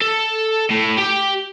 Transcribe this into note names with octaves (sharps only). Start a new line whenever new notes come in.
A4
A2
G4 G5